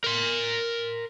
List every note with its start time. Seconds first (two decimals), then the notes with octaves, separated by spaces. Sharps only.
0.04 A#4 C6